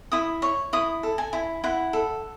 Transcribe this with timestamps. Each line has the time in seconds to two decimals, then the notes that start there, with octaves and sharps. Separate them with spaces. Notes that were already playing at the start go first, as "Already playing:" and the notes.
0.12 E4 D#6
0.42 C#5 C#6
0.73 E4 D#6
1.03 A4
1.18 G#5
1.33 E4
1.64 E4 F#5
1.93 A4